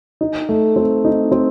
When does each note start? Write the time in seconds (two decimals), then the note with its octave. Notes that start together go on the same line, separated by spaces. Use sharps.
0.21 D#4
0.49 A3
0.76 C4
1.05 D#4
1.32 C4